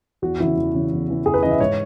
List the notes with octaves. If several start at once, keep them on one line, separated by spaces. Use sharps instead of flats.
E2 F#4
C#3 E3 E4
E2
C#3 E3
E2
C#3 E3
E2 G#4
B4
C#3 E3 D#5
E5
G#2 C#5